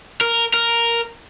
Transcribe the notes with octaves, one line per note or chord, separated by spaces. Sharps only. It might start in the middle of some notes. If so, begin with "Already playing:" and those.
A#4
A#4